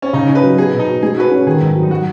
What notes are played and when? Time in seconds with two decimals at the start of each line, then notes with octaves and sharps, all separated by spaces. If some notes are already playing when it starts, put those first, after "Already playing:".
0.02 C#4
0.13 C#3 D#4
0.29 C#4
0.35 B4
0.44 F#3
0.57 B3 G#4
0.73 B2
0.79 D#4
0.87 F#4
1.03 G#3 G#4
1.17 F#4 B4
1.24 G#4
1.31 C#4
1.47 D#3 G#4
1.61 G#2
1.76 F#3
1.83 D#4
1.90 F#3 F#4